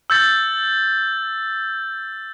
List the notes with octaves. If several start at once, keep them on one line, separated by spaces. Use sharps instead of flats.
E6 G6 A6